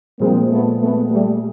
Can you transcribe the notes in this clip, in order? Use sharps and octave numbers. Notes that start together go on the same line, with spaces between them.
A#2 F3 G#3 A#3 C4
A3 B3
A3 B3
G3 A3